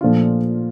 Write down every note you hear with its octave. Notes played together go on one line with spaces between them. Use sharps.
A#2 F3 A3 D4 F4